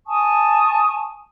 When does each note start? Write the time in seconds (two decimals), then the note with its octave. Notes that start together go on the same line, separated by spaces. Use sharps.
0.06 G#5 A5 C#6 D#6